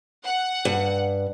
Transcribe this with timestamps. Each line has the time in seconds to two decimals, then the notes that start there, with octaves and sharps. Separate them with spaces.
0.25 F#5
0.65 G2